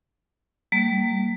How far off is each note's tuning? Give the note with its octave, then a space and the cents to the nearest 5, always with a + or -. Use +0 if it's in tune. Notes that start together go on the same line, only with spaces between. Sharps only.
G3 -25 A#3 -20